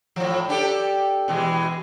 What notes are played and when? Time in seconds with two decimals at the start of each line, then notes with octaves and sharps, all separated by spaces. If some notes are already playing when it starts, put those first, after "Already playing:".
0.16 A2 F3
0.49 D4 G4 A4
1.28 B2 E3 G#3